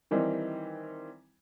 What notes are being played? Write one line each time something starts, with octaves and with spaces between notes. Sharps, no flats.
D#3 E3 G3 C4 D#4